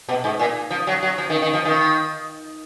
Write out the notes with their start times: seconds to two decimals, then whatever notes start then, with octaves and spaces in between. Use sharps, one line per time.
0.09 B2
0.24 G#2
0.39 A#2
0.70 F3
0.87 F#3
1.03 F#3
1.18 F3
1.30 D#3
1.42 D#3
1.54 F3
1.65 D#3